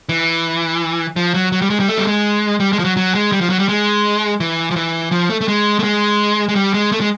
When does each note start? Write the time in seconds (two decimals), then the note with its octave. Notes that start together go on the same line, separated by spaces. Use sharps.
0.09 E3
1.16 F3
1.34 F#3
1.52 F#3
1.62 G3
1.70 G#3
1.80 G3
1.88 A3
1.98 G3
2.07 G#3
2.60 G3
2.73 G#3
2.79 F3
2.84 F#3
2.97 F#3
3.15 G#3
3.32 G3
3.41 F3
3.50 F#3
3.59 G3
3.69 G#3
4.40 E3
4.71 F3
4.76 E3
5.11 F3
5.30 A3
5.41 A3
5.48 G#3
5.79 A3
5.83 G#3
6.49 G#3
6.55 G3
6.74 G#3
6.92 A3
7.01 G#3